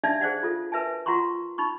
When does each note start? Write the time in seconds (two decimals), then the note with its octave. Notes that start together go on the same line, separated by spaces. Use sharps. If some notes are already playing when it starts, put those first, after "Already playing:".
0.04 D4 D#4 D5 E5 F5 A5
0.21 G#4 C5 D5 F#5
0.43 F4 A4 F5
0.72 A#4 B4 E5 G#5 A5
1.06 F4 F#5 A#5 C6 C#6
1.58 D#4 B5 C#6